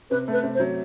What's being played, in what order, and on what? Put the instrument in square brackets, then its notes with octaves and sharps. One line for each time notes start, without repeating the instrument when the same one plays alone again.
[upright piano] C3 [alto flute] B4
[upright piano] A3 [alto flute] B4
[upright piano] C3
[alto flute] C5
[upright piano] F#3